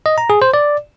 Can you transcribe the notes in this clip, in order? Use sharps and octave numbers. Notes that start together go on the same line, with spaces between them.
D#5
A#5
G#4
C5
D5